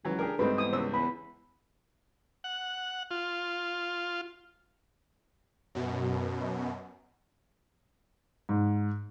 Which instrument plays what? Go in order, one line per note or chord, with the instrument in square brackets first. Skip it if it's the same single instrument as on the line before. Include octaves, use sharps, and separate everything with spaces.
[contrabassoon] C#2 [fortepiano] E3 F#3
[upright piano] D4 [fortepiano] G4 G#4 A#4
[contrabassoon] D1 [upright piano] G#2 G3 [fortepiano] A3 C4 D#4 [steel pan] B4
[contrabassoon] E2 [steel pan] D#6
[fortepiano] C#2 E6 [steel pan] C5
[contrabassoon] E2 [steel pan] B5
[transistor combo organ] F#5
F4
[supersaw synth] F#2 B2
[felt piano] G#2